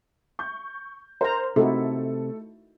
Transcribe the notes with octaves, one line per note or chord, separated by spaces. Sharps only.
C#6 G6
A#4 C5 A#5
C3 A3 D#4 E4 F#4 A4